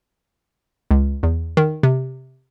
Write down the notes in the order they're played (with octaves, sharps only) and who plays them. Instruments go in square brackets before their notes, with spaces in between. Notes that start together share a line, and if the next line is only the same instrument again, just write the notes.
[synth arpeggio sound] C#2
E2
D#3
C3